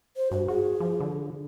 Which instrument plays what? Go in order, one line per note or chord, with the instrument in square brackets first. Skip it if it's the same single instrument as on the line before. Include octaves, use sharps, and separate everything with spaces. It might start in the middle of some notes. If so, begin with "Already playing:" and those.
[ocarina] C5
[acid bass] G2 [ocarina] F#4
[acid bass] F#4 [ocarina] G#4
[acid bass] F3
D3